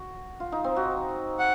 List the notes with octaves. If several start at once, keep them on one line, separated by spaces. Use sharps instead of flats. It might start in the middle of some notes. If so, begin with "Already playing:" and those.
Already playing: F#4
F4
D#4
C4
F#4
F#5